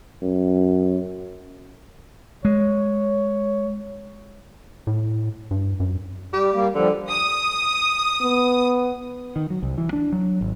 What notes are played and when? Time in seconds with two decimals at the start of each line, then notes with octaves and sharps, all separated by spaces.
0.22 F#2
2.45 G#3 C#5
4.87 A2
5.51 G2
5.80 F#2
6.33 G3 G4
6.53 G3 A#3
6.74 D3 F3 G3
7.10 D#6
8.21 B3
9.36 D#3
9.50 F#3
9.63 C2
9.78 E3
9.93 D4
10.12 F#3
10.41 G#1